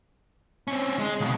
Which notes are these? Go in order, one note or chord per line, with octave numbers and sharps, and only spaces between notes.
C4 C#4
G#3
C#2 B2